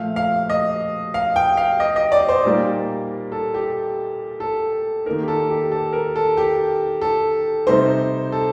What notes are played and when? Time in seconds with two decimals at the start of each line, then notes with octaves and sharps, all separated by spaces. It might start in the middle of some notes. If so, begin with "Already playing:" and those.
Already playing: A#2 F3 A3 F5
0.16 F5
0.50 D#5
1.14 F5
1.36 G5
1.57 F5
1.80 D#5
1.96 D#5
2.12 D5
2.29 C5
2.45 A#2 G3 A#3 D#4
3.32 A4
3.54 G4
4.40 A4
5.06 D#3 A#3 D#4 A#4
5.22 G4
5.28 A4
5.50 G4
5.72 A4
5.93 A#4
6.16 A4
6.37 G4
7.01 A4
7.67 C3 G3 C4 D#4 C5
8.32 A4